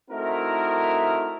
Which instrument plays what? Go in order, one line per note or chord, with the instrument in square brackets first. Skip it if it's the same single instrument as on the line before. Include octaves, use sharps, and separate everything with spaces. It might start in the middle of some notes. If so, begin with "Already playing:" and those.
[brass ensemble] A3 C4 D#4 E4 F#4 A#4